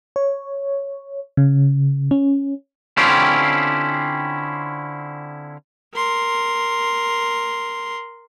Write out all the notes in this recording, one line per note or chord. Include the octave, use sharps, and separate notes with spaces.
C#5
C#3
C#4
D3 C4 C#4 E4 F4 G4
A#4 C6